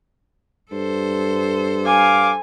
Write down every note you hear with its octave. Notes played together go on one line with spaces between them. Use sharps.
G2 A4 C5
F5 G#5 D6